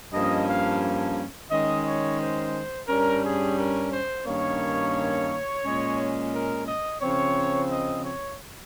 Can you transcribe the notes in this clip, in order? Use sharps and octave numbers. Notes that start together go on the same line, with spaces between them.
G2 F3 A#3 C#4 D#5
F5
D#3 G#3 C#4 D#5
C#5
C5
G2 G3 C#4 A#4
G#4
A#4
C5
G2 D#3 A#3 C#4 C#5
A#2 G#3 C#4
A#4
D#5
C#3 F3 C4 C#5
D#5
C#5